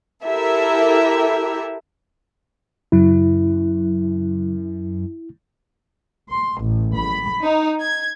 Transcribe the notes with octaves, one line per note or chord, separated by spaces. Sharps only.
E4 G4 A4 A#4 E5
F#2 C#3 F#3 E4
C6
A1
B5
D#4
G#6